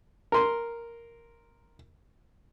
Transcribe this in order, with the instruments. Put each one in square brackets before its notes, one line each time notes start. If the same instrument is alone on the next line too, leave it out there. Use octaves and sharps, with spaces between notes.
[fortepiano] A#4 C6